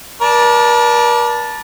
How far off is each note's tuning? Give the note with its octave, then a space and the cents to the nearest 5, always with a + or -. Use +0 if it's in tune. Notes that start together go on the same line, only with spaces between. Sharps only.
A#4 +45 D5 +0 A5 +0